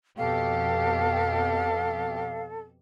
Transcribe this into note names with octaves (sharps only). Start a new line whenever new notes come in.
F2 B2 G4 A4 F5